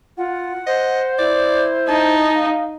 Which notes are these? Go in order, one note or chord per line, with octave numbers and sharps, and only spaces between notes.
F4 F#5
C5 D#5
E4 D5
D#4 A5
F5